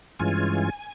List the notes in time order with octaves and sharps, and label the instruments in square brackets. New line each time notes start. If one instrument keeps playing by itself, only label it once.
[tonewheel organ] G2 E3 G#3 C#4 F4 G#5